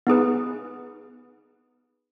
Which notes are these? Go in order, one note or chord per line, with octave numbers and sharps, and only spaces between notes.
B3 D#4 G#4 B4